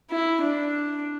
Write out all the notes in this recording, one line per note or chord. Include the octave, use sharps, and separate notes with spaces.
E4
D4